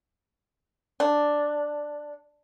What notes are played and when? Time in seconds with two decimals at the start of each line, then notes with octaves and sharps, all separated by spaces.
1.00 D4